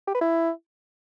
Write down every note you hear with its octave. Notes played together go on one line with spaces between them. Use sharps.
G4
B4
E4